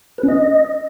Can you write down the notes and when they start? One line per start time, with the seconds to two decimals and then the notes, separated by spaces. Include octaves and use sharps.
0.18 B4
0.23 C#4
0.28 D#5